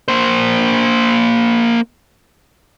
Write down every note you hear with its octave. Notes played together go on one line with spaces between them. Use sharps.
A#3 C5